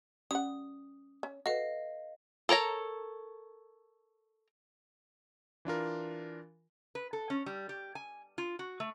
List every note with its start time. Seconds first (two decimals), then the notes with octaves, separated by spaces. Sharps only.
0.31 G3 C#4 F#5 D#6
1.23 C#4
1.46 F#4 A4 B4 D#5 F5
2.49 A4 A#4 C#5 A#5
5.65 E3 D4 F4 A#4
6.95 B4
7.13 A4
7.30 C#4
7.46 G3
7.69 G4
7.95 G#5
8.38 F4
8.59 F#4
8.80 A3